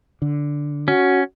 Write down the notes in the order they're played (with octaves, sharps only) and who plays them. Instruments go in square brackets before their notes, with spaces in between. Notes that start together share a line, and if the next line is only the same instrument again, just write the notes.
[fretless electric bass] D3
[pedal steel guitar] C#4 [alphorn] F#4